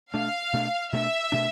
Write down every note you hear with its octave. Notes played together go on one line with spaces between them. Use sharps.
B2 A3 D4 F5
B2 A3 D4
B2 A3 D4 E5
B2 A3 D4